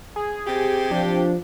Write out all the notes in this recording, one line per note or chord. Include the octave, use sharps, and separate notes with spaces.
G#4
C3 G4
F3 D4